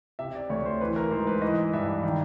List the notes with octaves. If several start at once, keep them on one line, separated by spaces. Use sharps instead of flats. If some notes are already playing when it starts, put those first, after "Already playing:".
C3 E5
D5
D2 C#5
C5
E3 B4
A#4
G#2 C5
B4
E3 D#5
G2 E5
D#3